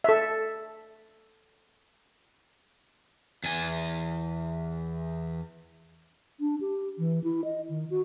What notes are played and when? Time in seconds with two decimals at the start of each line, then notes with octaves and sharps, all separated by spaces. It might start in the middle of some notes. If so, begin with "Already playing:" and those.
0.04 A4 E5
3.44 E2 G#5
6.40 D4
6.61 G4
6.99 E3
7.24 E4
7.44 D#5
7.69 D#3
7.90 F#4